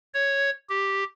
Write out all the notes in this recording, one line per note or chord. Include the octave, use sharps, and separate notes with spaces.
C#5
G4